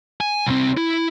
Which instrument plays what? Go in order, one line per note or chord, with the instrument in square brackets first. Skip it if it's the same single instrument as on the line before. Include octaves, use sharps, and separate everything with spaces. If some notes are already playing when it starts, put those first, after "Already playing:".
[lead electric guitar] G#5
C2 C4
E4